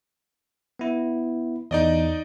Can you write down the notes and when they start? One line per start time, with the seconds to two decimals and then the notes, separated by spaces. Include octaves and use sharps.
0.79 B3 E4
1.71 E2 D#4 D5 D#5